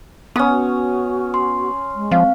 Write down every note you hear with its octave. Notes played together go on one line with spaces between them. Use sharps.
B3 C#4 D#6
F#4
C6
G#3
F3 C4 F5